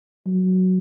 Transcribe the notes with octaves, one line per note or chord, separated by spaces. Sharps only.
F#3